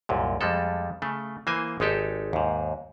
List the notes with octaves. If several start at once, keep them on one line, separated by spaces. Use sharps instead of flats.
C2 F#2 A#2
F2 G3 G#3 A4
C#3 A3
E3 A#3 C5 G#5
G#1 G#3 D#4 G4 A4
D#2 G#2